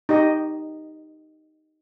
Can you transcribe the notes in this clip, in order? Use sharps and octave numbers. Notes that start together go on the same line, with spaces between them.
D#4 G4 D#5